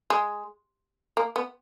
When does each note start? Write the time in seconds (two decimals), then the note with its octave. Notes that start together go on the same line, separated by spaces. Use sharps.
0.10 G#3
1.17 A#3
1.36 B3